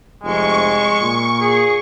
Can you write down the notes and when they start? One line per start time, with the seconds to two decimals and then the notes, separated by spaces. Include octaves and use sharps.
0.24 F1 G#3 C#6
1.01 A#2
1.41 G#4